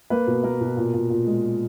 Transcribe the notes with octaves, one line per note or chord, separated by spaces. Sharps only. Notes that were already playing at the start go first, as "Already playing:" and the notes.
A#3 B4
B2
A#3 A#4
B2
A#2
A#2
A#2
G#3